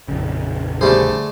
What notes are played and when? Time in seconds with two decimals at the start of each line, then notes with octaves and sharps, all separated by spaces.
0.08 A#1 F2 C#3
0.81 D3 G3 A3 G#4 C5